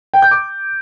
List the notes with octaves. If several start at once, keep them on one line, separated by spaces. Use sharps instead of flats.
G5
G6
D6